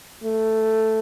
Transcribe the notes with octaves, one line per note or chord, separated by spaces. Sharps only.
A3